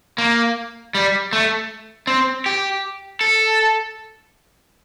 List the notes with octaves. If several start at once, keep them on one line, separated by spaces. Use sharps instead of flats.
A#3
G3
A3
C4
G4
A4